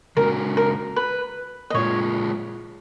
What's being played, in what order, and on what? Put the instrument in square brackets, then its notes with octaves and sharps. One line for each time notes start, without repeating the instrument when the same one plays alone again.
[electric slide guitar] C#3 G#3 C#4 F#4 [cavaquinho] A#4
[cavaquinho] A#4
B4
D#5
[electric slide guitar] A#2 G#3 C#4 F4 G#4 [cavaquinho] C#5